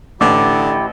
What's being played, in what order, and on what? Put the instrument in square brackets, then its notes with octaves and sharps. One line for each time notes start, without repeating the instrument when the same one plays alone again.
[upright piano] A1 [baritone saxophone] D3 [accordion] E4 G4 [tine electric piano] D6